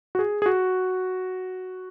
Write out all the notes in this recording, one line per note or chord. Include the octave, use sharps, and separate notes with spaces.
F#4
G#4
G#4
F#4